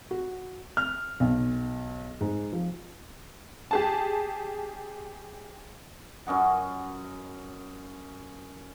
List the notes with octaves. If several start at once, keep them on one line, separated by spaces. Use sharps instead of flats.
F#4
F6
B1
G#2
F3
G4 G#4 A5
F#2 C#4 D#5 F#5